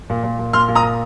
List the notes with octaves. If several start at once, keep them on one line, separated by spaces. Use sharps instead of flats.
A#2
A#2
A#2
A#2 C6 F6
A#2
A#5 D#6
A#2